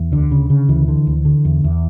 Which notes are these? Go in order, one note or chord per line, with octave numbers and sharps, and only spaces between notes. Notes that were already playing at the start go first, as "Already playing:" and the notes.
Already playing: E2
D2 D3
C#3
C#3
D2 E3
D3
D2
D3
E2
E2